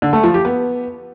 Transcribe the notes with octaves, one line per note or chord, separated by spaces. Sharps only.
D3
A3
F3
G4
B3